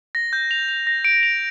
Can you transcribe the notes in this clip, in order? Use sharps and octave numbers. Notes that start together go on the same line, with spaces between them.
A#6
G6
F7
F7
A#6
D7
F7